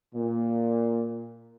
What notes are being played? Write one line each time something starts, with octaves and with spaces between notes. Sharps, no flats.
A#2